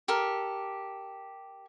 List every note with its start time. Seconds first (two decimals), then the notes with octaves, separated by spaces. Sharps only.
0.08 G4 A4 A#4